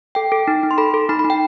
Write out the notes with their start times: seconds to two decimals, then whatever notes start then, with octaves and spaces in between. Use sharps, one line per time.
0.15 A4 G5
0.32 A4
0.48 D#4
0.63 D#4
0.71 C6
0.78 A4 B5
0.94 A4
1.09 D#4 B5
1.19 B5
1.24 D#4
1.30 G5